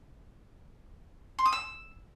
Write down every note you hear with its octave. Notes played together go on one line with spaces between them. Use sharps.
C6
D#6
E6